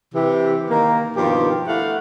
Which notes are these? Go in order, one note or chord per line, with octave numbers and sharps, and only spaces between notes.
C3 E3 G4
D#3 A#3 A#5
G2 B2 D#3 F3 F4 G4
A3 E4 F5 F#5